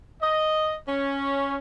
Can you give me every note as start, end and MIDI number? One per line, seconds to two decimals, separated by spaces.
0.22 0.76 75
0.87 1.58 61